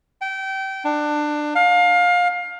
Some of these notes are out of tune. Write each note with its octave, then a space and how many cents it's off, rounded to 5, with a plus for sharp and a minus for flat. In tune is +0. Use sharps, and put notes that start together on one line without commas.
G5 -25
D4 +20
F5 +25